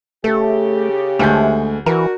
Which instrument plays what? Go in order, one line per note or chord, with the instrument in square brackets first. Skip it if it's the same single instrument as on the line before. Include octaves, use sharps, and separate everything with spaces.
[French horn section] C#3 G4 [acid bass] A3 [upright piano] A4
[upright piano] D2 G#3 G6 [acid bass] A3
[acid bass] E3 [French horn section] D4 F#4 [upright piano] A#4